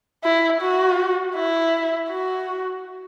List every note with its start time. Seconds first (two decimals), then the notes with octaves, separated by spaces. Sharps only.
0.24 E4
0.61 F#4
1.36 E4
2.10 F#4